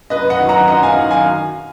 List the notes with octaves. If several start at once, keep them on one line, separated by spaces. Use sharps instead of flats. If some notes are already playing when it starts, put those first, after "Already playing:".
F#2 B4 D#5
D#5 F#5
D#3 F#3
F#5 A#5
F#2 D#5 F#5
F5 G#5
D#3 F#3
F5 G#5